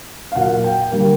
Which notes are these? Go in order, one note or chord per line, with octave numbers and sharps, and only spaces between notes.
F5
A#2 F#3 A#3 F#5
G5
D3 G3 A#3